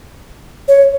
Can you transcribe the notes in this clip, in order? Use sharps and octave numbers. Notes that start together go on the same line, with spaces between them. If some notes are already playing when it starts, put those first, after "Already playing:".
C#5